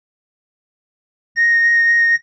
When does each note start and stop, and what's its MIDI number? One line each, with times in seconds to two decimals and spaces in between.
1.36 2.15 94